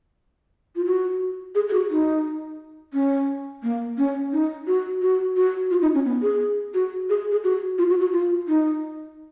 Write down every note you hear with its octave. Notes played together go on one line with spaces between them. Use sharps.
F4
F#4
G#4
G#4
F#4
D#4
C#4
A#3
C#4
D#4
F#4
F#4
F#4
F4
D#4
C#4
B3
G#4
F#4
G#4
G#4
F#4
F4
F#4
F#4
F4
D#4